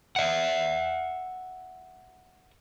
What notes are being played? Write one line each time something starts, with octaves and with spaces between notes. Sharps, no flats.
E5 F#5